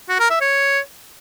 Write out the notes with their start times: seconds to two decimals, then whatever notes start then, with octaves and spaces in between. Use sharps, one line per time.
0.09 F#4
0.20 A#4
0.30 E5
0.41 C#5